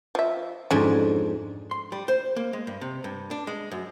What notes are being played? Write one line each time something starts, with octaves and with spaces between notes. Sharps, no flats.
F3 E5
F2 G#2 C#4 D4
C6
G3
C5
A#3
G#3
G2
C3
G2
D4
G#3
F#2